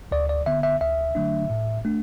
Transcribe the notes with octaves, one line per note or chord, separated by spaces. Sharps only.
D2 D5
D5
D3 B3 E5
E5
D2 E5
D3 F#3 A3 D4
A2
A3 D4